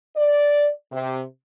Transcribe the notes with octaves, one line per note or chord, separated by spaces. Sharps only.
D5
C3